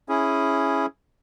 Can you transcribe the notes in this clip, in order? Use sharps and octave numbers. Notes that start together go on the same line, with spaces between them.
C#4 E4 G#4